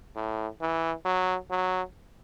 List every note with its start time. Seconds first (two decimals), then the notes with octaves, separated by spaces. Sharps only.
0.16 A2
0.61 E3
1.05 F#3
1.50 F#3